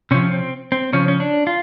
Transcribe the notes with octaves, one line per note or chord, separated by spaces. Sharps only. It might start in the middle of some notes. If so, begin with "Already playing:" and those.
C3 F3 C#4
C4
C4
C#3 F3 C#4
C#4
D4
F4